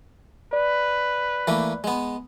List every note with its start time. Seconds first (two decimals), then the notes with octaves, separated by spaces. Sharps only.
0.53 B4 D5
1.47 E3 A3 A#3
1.84 G#3 B3